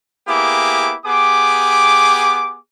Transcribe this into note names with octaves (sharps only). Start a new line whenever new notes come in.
A#3 B3 E4 G4 G#4 D6
B3 G4 G#4 D6